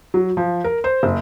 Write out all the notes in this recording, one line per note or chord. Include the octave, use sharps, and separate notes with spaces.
F#3
F3
A#4
C5
F#1